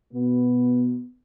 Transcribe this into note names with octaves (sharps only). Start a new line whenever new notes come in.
B2 B3